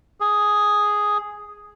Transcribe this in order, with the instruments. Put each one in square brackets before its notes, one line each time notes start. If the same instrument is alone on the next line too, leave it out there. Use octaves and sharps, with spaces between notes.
[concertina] G#4